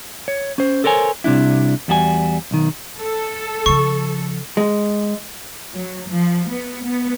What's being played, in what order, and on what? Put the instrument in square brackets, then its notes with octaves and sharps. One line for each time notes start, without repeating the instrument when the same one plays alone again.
[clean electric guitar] C#5
C#4 C5
A4 A#4 C5 C#5 G#5
C2 C3 F#3 D4 E4
E2 G3 F#4 G4 G#5
B1 D#3
[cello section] A4
[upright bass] C#3 F3 [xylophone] C#6
[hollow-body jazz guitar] G#3
[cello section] F#3
F3
B3
B3